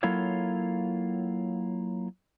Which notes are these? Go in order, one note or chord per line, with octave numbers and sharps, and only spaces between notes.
F#3 A#3 E4 F4 A4 C#5